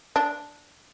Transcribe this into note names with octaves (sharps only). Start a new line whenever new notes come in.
D4